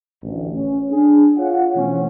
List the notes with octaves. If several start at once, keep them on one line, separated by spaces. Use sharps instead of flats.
A1 D2
C#4
D4 G#4
F4 C#5 F5 F#5
B2 E3 A3 C4 C#4